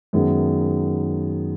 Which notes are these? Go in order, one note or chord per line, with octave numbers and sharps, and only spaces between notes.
F#2 D#3 G#3 B3